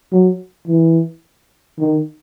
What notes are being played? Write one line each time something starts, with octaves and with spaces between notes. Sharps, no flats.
F#3
E3
D#3